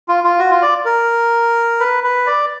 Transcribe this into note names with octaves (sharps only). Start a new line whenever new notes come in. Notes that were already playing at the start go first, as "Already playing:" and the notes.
F4
F4
F#4
F4
D5
A#4
B4
B4
D5